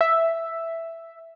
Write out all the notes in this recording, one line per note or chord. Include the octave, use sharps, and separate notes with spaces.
E5